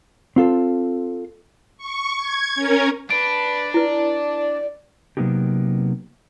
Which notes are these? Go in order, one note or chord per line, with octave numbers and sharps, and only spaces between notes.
C4 F4 A4 C5
C#6
G#6
C#4 A#4
D4 B4 D7
E4 B4 D5
C3 F#3 A#3 B3 D#4 G4